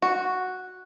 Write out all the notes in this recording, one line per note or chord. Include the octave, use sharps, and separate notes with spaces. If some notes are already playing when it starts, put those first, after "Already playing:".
F#4